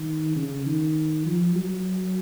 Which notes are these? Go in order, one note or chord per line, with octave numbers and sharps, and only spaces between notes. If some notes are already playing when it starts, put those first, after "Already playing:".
Already playing: D#3
C#3
D#3
F3
F#3